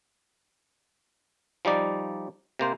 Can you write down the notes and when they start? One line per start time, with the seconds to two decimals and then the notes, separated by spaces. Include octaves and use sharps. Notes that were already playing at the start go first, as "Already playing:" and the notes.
1.65 F3 G3 D#4 D5
2.59 C3 A#3 C5